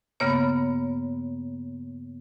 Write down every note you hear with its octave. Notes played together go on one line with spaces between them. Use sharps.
G2 C#3 A#3 B3 C#5